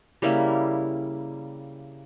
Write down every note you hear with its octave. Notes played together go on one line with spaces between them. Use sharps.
C#3 G3 A#3 E4